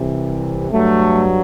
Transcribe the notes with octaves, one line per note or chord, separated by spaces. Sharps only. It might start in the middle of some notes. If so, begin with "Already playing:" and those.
Already playing: C2 C3 E3
G2 F#3 A3